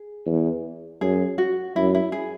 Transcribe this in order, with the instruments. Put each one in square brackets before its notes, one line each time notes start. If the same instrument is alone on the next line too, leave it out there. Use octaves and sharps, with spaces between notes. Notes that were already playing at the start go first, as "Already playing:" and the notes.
Already playing: [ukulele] G#4
[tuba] E2
[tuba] F#2 [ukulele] G#4
[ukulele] F#4
[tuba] F#2 [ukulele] E4
[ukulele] E4
G#4